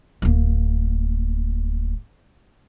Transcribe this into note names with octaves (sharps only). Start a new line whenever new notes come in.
D1 A#3